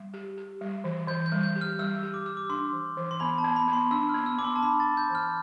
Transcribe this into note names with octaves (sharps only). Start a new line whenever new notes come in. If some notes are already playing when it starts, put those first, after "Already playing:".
Already playing: G3
G4
G4
G3
E3
E3 G6
G6
G3
G6
G4
F6
G3 E6
G4
D6
G4 E6
D6
D4 C6
E3
E3
C6
B3 B5
A5
B3
B5
B3
C6
D4 E6
F6
B3
E6
B3 D6
C6
A5
D4 B5
A6
D4
G6
E3
F6